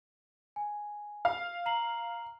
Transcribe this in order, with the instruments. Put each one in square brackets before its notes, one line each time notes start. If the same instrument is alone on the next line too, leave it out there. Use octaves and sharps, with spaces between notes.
[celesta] G#5
[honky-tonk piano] F5
[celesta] A#5 C7 F#7